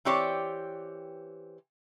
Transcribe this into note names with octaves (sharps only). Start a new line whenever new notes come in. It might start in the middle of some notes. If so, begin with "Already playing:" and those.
E3 C4 G4 C#5 D5